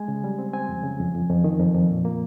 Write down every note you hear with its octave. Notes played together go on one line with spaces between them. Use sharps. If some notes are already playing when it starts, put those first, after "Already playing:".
Already playing: G#3 G#5
C#3
G3
C4
C4 G#5
F2
C#3
F2
F2
F2
D#3
F2
F2
A#2
A#3